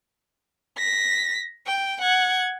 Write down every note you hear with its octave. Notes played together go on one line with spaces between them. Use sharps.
A#6 B6
G5
F#5 G#6